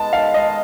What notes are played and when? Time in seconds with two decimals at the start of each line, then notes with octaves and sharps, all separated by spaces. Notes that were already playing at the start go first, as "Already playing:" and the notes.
Already playing: G#3 B3 D#4 A5
0.13 D#3 F5
0.34 G#3 D#5